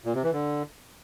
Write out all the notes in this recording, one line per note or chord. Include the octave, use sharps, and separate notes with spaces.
A#2
C3
E3
D3